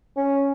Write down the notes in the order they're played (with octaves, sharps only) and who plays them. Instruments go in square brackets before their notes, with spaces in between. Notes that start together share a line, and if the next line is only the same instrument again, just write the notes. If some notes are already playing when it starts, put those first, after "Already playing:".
[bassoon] C#4